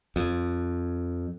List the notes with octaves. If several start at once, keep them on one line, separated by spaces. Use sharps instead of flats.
F2